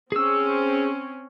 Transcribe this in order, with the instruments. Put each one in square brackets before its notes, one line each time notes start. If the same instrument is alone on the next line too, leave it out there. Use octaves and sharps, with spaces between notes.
[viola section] C4 C#4 [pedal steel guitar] G#4 E6